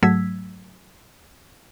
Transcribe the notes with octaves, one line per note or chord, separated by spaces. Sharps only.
G#2 F#3 A3 E6 G#6 B6